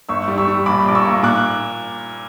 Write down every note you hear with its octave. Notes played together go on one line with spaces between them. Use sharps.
G1 C#6 E6
G3
C#6 E6
G3
A#1 B5 D6
A#1 D6
C#6 E6
A#3
A#2 D6 F#6